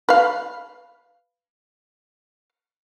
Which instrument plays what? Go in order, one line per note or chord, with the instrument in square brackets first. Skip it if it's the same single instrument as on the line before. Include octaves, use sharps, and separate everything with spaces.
[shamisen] B4 F5